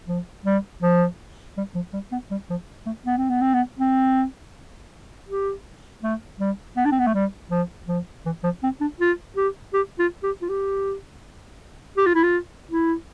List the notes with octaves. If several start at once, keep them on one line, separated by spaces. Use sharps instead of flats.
F3
G3
F3
G3
F3
G3
B3
G3
F3
A3
B3
C4
B3
C4
B3
C4
G4
A3
G3
B3
D4
C4
B3
A3
G3
F3
F3
E3
F3
C4
D4
F4
G4
G4
F4
G4
F4
G4
G4
F4
E4
F4
E4